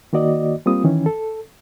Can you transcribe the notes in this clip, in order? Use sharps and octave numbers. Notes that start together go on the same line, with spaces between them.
D#3 A#3 F#4 D5 D#5
G3 A#3 C4 F4 D#6
D#3 E3 C#4
A4